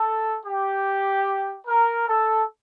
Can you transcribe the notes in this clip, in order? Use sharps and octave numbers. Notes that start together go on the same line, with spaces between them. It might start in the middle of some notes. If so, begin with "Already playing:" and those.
Already playing: A4
G4
A#4
A4